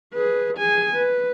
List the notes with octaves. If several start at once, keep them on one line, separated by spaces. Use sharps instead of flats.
G#4 B4
G#4 G#5
B4